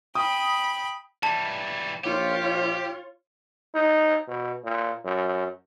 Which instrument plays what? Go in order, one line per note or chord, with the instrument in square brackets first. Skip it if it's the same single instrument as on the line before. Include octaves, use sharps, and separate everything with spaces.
[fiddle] G5 B5 [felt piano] D#6
[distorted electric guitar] E3 G3 [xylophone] A5
[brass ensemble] A#1 F5 [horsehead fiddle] F4 C#5 [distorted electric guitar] G4
[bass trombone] D#4
B2
A#2
F#2